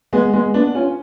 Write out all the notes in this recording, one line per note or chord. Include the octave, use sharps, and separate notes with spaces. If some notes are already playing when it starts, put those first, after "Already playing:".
G#3 B3
G#3 B3
B3 D4
C#4 F4